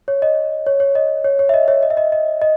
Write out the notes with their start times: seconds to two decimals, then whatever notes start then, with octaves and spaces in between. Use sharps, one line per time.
0.08 C#5
0.22 D#5
0.66 C#5
0.80 C#5
0.95 D#5
1.24 C#5
1.39 C#5
1.49 E5
1.54 D#5
1.68 C#5 E5
1.83 D#5
1.90 E5
1.97 D#5
2.12 D#5
2.41 D#5